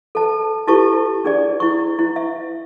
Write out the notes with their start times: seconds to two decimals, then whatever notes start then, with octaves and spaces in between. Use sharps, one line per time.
0.15 A4 A5
0.67 E4 F4 G4 A4 A5 C#6
1.24 D4 G#4 D5
1.60 E4 C#6
1.99 E4
2.16 E5